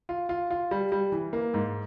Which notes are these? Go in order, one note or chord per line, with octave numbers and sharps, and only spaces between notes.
F4
F4
F4
G3
G3
E3
A#3
G#2